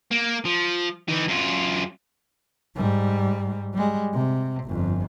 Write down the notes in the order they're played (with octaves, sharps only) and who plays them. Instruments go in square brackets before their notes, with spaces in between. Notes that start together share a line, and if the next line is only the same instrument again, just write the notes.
[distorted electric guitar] A#3
F3
E3 D#4
F#2 F4
[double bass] G#2 G3
G3 G#3
C3
G1 F2